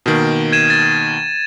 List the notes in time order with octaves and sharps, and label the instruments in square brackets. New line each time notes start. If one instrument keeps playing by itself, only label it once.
[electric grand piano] B2 D#3 A#3
[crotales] G#6 D#7 E7
A6